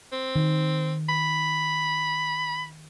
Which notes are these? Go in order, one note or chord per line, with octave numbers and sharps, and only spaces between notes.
C4
D#3
B5